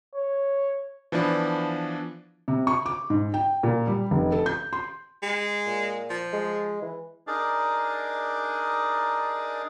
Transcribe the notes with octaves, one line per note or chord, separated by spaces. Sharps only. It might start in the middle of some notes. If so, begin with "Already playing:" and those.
C#5
E3 F3 B3 D4
C3
C#6
D6
G#2
G5
A#2
G3
F1
A4
G6
C6
G#3
A#2
F3
G#3
E3
D4 D#4 G#4 A#4 D5 A5